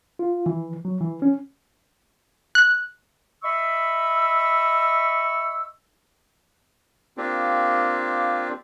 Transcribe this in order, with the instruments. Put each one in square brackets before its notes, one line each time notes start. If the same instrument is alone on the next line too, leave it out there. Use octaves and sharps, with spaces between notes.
[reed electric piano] F4
E3
F#3
E3
C#4
[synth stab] F#6
[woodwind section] D#5 E5 B5 C#6 E6
[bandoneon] A#3 C4 D4 F4 G4